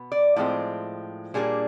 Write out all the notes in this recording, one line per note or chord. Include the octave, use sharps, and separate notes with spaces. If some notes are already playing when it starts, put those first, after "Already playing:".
Already playing: B2 B3
D5
A2 F3 G#3 C4
A#2 G3 A#3 D4 G#4